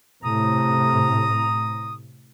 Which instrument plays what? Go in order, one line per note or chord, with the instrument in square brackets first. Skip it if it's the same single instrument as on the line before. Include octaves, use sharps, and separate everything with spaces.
[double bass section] A2 C3 [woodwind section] A#5 D#6